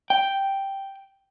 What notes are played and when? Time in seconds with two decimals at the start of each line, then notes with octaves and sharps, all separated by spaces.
0.10 G5